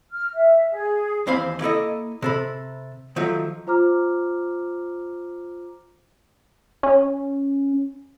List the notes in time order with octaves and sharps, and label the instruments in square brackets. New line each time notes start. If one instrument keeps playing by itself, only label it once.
[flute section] F6
E5
G#4
[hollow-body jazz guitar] D#2 E3 C4 C5 F5 B5
A#3 E4 A4 D#5
C3 A4 B5
D#3 F3 F#3 A3
[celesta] F4 C5 A#5 D6 F6
[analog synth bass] C#4